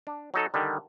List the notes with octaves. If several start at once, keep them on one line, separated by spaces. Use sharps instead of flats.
D4
F#3 D#4 A4
D3 D#3 G3